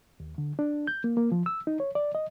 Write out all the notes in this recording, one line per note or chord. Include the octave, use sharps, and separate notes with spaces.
D#2
D3
D4
G6
A#3
A#3
F3
E6
D#4
C#5
D5
D#5